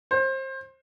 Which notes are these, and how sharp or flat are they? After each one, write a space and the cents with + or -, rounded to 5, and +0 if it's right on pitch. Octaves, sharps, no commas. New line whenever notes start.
C5 +25